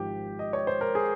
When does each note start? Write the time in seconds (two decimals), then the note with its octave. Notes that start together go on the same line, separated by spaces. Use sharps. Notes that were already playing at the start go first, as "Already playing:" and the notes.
Already playing: G#1 G#2 F3 G4
0.39 D#5
0.53 C#5
0.67 C5
0.81 A#4
0.95 G#4